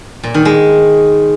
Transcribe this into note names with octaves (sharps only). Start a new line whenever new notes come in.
A#2
D#3
G#3